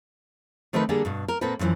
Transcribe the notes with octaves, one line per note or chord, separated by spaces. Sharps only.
D#3 A3 C4 D#4 A#4 B4
D3 G3 A#3 D4 G#4 A4
G2 B2
A#4
A#2 A#3 C4 A4 B4
F#2 A#2 D3 E3 F3